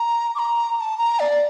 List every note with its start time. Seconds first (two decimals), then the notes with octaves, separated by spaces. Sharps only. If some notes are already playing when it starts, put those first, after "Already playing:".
Already playing: A#5
0.35 D6
0.39 A#5
0.77 A#5
0.81 A5
0.98 A#5
1.20 D5